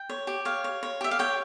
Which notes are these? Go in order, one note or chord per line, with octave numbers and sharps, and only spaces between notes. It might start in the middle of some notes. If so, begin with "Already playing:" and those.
Already playing: G5
C#5
G4
C#5 F5
C#5
C#5
G4 E5
F5
C#5 G5